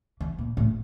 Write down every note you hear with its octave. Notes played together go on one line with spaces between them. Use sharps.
E3
A#2
A2